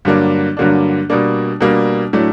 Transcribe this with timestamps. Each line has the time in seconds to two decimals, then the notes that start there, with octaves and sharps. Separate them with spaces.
0.05 G2 D3 F#3 A#3 D4
0.57 G2 D3 F#3 A#3 D4
1.10 B2 G3 A#3 D4
1.61 B2 G3 A#3 D4
2.13 A2 F#3 A3 D4